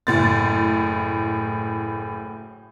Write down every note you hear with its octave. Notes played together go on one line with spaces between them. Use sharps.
F#1 A2 A6